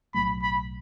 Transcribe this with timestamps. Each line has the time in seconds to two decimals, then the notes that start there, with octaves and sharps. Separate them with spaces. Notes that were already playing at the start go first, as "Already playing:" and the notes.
0.14 B1 A2 F#3 A3 B5
0.43 B5